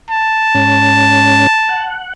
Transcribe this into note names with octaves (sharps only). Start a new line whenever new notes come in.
A5
G#2 C#4
F#5